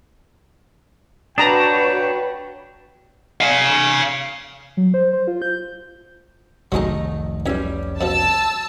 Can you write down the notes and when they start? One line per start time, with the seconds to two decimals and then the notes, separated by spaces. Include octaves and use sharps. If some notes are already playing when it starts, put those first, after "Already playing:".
1.38 D4 F#4 B4 C#5 G5 A#5 D#6
3.41 F5 G#5
4.77 F#3
4.94 C5
5.13 C5
5.27 F4
5.42 G6
6.72 F1 C2 D#3 F#3 G#3 A3 D#4 D#5
7.46 B1 E2 G3 C#4 E5
8.01 F2 B2 F3 A5 E6